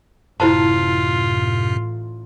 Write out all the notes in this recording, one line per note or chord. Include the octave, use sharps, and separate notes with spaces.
A1 F#2 C3 E4 F4 C5 A5